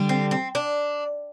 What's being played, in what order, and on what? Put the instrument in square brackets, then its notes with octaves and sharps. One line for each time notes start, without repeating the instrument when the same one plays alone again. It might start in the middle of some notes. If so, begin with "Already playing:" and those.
Already playing: [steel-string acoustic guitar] D3 G3 D4 G4
[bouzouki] C4
C4
D4